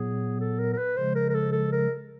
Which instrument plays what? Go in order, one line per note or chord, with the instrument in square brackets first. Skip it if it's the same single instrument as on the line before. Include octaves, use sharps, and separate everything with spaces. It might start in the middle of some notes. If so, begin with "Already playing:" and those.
Already playing: [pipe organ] A#2 F#3 B3 [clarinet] G#4
[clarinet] A4
A#4
A#4
B4
[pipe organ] C#3 F3 G#3 [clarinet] C5
[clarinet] A#4
A#4
A4
A4
A#4